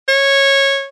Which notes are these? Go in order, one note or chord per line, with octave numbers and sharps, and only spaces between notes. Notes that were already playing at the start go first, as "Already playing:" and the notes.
C#5